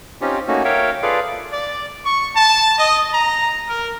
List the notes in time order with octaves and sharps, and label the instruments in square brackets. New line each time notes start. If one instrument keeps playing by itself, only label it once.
[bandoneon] C4 C#4 D#4 F4 G4
A3 A#3 C#4 D#4 F#4
A#4 C#5 E5 F5 G5
F4 G#4 A4 B4 D5 F5
[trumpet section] D5
C#6
A5
D#5
A#5
A#4